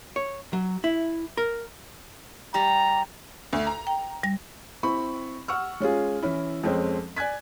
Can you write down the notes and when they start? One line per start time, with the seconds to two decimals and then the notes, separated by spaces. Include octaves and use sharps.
0.16 C#5
0.53 F#3
0.84 E4
1.37 A#4
2.54 G3 G4 A#5
3.53 D2
3.67 A#5
3.87 G5
4.23 G3 A#6
4.83 C4 E4 B5 C#6
5.48 F#5 C#6 E6 F6
5.80 G#3 C#4 F4 G#4
6.23 E3 C#4 E4
6.63 F2 G#3 C4 C#4
7.16 D5 G#5 F#6 G#6 B6